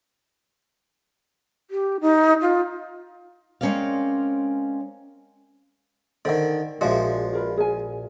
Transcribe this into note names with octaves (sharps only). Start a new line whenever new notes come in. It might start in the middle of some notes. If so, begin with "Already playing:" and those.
G4
D#4
F4
G#3 C4 C#4 A#4 D5 F5
D3 D#3 C5 D5 G5
A#1 F3 G#3 F#4 D5 E5
F4 A#4 B4
G#4 G#5